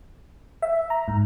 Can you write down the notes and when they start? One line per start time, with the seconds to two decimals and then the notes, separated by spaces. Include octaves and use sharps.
0.62 E5
0.90 A#5
1.08 G#2